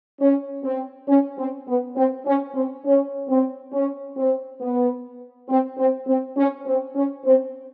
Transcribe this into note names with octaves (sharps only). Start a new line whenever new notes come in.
C#4
C4
C#4
C4
B3
C4
C#4
C4
C#4
C4
C#4
C4
B3
C4
C4
C4
C#4
C4
C#4
C4